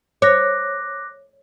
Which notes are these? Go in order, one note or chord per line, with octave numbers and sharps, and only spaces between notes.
C#5 D6 F#6 A#6